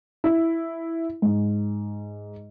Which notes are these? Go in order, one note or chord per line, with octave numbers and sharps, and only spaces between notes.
E4
G#2